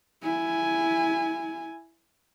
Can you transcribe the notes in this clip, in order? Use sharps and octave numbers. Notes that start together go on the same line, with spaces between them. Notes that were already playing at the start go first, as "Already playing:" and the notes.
E4 G#5